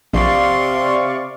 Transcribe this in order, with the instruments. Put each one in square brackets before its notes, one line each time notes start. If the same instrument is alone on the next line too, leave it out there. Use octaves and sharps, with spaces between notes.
[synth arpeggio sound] A#1 [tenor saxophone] C3 [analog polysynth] D5 F5 C#6 [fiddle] C6